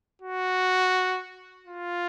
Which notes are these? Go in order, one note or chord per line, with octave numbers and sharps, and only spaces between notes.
F#4
F4